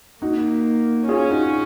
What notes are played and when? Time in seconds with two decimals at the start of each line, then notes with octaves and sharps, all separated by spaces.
0.22 A#3 D#4 F#4
1.09 C#4 F4 G#4
1.30 D#4 F#4